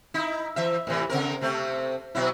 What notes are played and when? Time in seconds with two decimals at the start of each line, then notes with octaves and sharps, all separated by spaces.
0.14 D#4 E4
0.56 E3 E5
0.87 A2 C3 E3
1.09 C#3 C4 A#4
1.41 C3 A3 C4
2.15 B2 F#3 E4